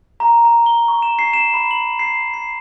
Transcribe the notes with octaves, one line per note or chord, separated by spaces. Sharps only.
A#5
A#5
G7
C#6
E7
C7
E7
B5
F#7
C7
C7